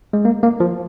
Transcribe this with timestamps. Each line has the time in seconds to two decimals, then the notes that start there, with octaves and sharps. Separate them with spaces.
0.13 G#3
0.25 A#3
0.43 A#3
0.60 F3